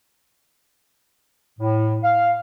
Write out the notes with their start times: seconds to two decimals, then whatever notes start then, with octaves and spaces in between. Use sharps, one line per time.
1.60 A2
2.03 F5